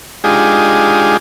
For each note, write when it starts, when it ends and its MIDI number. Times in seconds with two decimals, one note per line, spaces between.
0.24 1.17 56
0.24 1.17 62
0.24 1.17 63
0.24 1.17 65
0.24 1.17 67
0.24 1.17 68